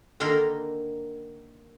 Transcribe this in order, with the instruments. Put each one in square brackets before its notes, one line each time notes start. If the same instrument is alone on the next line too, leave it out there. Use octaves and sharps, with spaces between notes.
[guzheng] D3 D#3 A#3 A#4 B5 C6